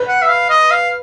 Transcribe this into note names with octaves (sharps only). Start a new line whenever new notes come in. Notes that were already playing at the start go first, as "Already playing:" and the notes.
Already playing: B4
F#5
E5
F5
D#5
F5